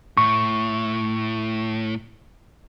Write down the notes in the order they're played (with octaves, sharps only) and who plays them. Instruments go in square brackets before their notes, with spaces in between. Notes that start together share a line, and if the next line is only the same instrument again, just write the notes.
[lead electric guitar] A2 [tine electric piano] C#6